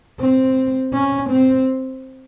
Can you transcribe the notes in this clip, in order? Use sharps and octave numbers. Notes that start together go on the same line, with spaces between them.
C4
C#4
C4